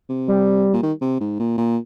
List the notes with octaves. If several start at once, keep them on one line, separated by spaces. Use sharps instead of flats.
C3
G3
A#2
D#3
C3
G#2
A#2
A#2